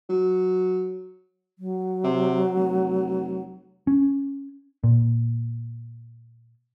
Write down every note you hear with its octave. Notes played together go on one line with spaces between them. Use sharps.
F#3
F#3
C3
F1
C#4
A#2